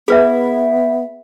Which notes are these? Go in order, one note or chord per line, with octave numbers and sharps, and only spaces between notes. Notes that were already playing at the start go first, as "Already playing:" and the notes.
B3 E4 G#4 B4 E5